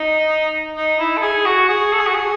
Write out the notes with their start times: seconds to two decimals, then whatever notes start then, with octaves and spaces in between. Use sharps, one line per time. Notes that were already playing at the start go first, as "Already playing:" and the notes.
Already playing: D#4
0.76 D#4
0.99 E4
1.17 A4
1.23 G#4
1.46 F#4
1.69 G#4
1.93 A4
1.99 G#4
2.07 F#4
2.14 G#4